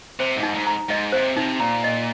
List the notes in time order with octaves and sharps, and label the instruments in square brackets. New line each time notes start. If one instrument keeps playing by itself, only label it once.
[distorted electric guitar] C3 [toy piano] C5
[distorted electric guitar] G#2
[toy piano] D#4
[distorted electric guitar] G#2
[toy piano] A#5
[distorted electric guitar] G#2 [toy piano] D#5
[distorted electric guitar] C3 [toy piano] C5
[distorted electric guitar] C3 [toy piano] D#4
[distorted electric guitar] A#2 [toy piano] A#5
[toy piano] D#5